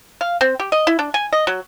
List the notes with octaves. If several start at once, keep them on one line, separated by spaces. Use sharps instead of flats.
F5
C4
G4
D#5
E4
D4
G#5
D#5
F#3